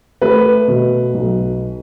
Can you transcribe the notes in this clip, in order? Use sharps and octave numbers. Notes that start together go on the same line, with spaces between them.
A3 B4
B2
B1